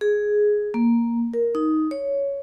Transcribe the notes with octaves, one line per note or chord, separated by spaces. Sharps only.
G#4
A#3
A#4
D#4
C#5